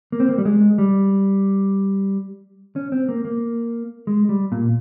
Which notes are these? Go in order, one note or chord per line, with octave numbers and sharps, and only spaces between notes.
A#3
C4
A#3
G3
G#3
G3
C#4
C4
A#3
A#3
G#3
G3
A#2